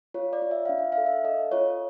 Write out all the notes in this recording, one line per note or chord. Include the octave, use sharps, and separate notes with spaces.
F4 C#5
D5
F4
E5
D4 F5
E5
F5
A4
E5
A4 D#5
F4 C#5